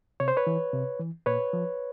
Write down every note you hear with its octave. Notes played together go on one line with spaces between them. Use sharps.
C3 C#5
C5
B4 C#5
E3
C3
E3
A#2 B4 C#5
F3